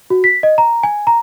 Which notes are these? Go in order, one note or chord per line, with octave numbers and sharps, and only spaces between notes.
F#4
B6
D#5
A#5
G#5
A#5